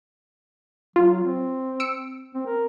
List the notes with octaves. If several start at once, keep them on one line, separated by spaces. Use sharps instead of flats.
F#3 F4
C4
E6 C#7 D7
C4
A#4